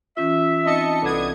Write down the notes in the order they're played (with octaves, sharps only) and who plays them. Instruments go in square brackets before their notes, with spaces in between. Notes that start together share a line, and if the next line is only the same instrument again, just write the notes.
[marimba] E3 C#4 F4 [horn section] E5
[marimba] C4 D#4 [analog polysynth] D#5 A5 C#7
[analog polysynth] C2 D#6 G#6 [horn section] B3 D4 [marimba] A4